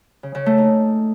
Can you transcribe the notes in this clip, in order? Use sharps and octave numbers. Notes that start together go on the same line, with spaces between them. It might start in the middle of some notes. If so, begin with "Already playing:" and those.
C#3
C#3
A3
D#4